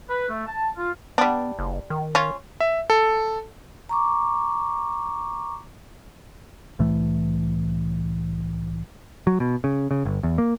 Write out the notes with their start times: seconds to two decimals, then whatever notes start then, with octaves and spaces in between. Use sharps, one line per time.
0.09 B4
0.28 A3
0.46 A5
0.76 F4
1.18 G3 B3 D4
1.59 F#1
1.90 D#3
2.15 C#4 F4
2.60 E5
2.90 A4
3.89 A#5 C#6 D6
6.79 C2 A2 E3 A3
9.27 F#3
9.40 B2
9.64 C#3
9.91 C#3
10.05 G1
10.23 E2
10.38 A#3